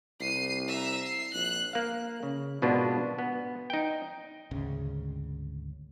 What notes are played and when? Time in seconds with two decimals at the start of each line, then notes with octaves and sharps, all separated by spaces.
0.21 C2 C7 D#7
0.68 E5 A#5
1.02 C7
1.34 A#1 F#6
1.73 A#3 F5
2.23 C#3
2.62 G#1 B2 B3 D4 F4 A5
3.19 B3
3.70 D#4 G5
4.51 G#1 D2 C#3